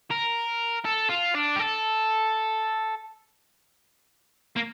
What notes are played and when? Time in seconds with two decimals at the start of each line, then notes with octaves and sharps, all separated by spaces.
0.11 A#4
0.85 A4
1.10 F4
1.35 D4
1.56 G4
1.59 A4
4.56 A#3